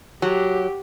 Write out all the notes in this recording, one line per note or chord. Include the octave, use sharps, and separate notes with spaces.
F#3 G4